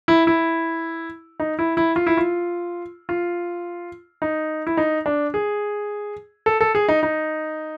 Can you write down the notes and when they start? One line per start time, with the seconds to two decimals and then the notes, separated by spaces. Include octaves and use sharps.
0.08 E4
0.27 E4
1.40 D#4
1.59 E4
1.77 E4
1.96 F4
2.07 E4
2.17 F4
3.09 F4
4.22 D#4
4.67 E4
4.77 D#4
5.06 D4
5.34 G#4
6.46 A4
6.61 A4
6.75 G#4
6.88 D#4
7.03 D#4